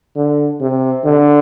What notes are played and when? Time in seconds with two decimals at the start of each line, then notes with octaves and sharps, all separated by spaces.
0.16 D3
0.61 C3
1.05 D3